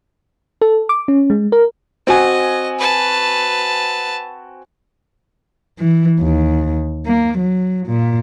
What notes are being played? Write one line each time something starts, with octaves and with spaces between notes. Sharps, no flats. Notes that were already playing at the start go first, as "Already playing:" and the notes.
A4
D6
C#4
G#3
A#4
C4 F#4 D#5 G#5
B4 A5
E3
D#2
A#3
F#3
A#2